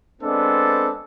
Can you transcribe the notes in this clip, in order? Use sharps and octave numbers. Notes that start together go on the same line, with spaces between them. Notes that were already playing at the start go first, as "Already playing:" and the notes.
G#3 B3 C4 D4 A4